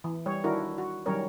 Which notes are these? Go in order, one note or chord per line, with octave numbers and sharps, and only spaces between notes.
E3
G3 C#5
D#3 D4 E4 F#4 A#4
F#4
D#3 F#3 G3 C#4 A#4 C#5